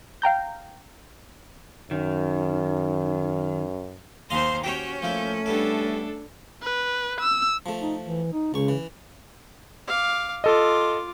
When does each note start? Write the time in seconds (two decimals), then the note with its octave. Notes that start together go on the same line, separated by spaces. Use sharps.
0.22 F5 G5 A#5 G6
1.91 F#2 D#3
4.30 D#2 C5 D#5 F5 G#5 C6
4.64 C#4 F#4 G4 C5 C#5 G5
5.02 F3 A3 A#3 E4 G6
5.46 G3 B3 D4 E4 A4
6.63 B4
7.21 E6
7.66 F3 A3
7.81 D#4
8.02 E3
8.33 D#4
8.54 C#2 C#3 C#6
8.68 E3
9.88 F5 D6
10.44 F4 A4 D#5 D6